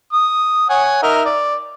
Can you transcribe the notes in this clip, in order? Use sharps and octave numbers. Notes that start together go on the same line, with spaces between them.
D#6
C#5 F#5 G#5
D#4 A#4 E5
D5